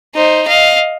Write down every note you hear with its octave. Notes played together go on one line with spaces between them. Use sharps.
D#4 C5
D#5 F5